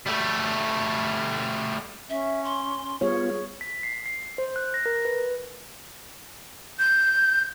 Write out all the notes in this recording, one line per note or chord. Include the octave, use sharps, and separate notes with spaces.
G3 A3
C#4 E5
C6
G3 B3 F4 G#4 C#5
B6
C7
C7
C5
F#6
A#6
A#4
B4
G6